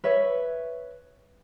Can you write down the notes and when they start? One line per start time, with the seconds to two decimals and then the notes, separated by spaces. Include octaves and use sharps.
0.04 B4 C#5 E5